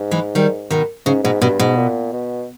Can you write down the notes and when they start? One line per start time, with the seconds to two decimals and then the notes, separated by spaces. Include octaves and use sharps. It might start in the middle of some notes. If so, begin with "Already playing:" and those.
Already playing: G#2
0.11 E3 G#3
0.35 D#3 G3
0.70 B2 D#3
1.06 G#2 C#3
1.24 G#2 B2
1.41 G2 B2
1.59 G#2 B2
1.77 A#2
2.13 B2